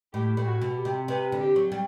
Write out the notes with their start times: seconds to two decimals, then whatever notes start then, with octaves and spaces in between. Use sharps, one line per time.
0.13 A2 G4
0.37 A2
0.46 F#4
0.61 B2
0.77 G4
0.85 C3
1.08 C3 B4
1.32 D3
1.40 G4
1.56 F#3
1.72 G3